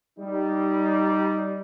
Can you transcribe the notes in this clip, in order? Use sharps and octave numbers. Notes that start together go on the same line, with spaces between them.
G3 D#4